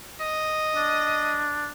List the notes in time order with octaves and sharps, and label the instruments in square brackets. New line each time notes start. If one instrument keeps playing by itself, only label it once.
[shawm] D#5
[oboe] D4